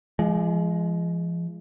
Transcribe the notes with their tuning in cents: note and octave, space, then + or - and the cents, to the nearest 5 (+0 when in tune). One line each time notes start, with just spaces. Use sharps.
F3 -40 G#3 +0